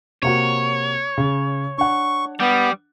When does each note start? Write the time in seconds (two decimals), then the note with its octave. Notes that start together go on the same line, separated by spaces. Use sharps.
0.23 C3 A#3 F#4 C#5
1.18 C#3
1.78 D4 F#5 C#6
2.40 G3 B3